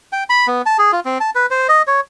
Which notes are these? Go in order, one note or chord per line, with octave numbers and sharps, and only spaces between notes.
G5
B5
B3
A5
G#4
F4
C4
A5
B4
C5
D#5
C#5